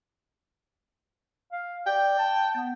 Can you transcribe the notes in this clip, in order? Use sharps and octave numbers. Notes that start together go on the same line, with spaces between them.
F5
D5 G5
A5
B3